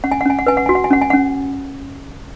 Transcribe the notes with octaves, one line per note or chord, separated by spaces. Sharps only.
C#4 F#5
G#5
F#5
C#4 G#5
F#5
B4 G#5
F#5
F#4 G#5
F#5
G#5
C#4 F#5
G#5
C#4 F#5